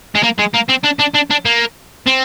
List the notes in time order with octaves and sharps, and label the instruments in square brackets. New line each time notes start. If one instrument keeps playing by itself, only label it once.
[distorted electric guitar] G#3
A#3
G#3
A#3
C4
D4
D4
D4
D4
A#3
C4